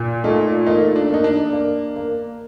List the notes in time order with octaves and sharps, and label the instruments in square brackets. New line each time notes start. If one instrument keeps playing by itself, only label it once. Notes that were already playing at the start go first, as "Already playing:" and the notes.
Already playing: [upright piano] A#2
[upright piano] A3 [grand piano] D#4 F4
[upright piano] A#3 [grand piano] D#4 F4
[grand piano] D4
[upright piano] A#3 [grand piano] D#4
[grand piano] D4
[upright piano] A#3
A#3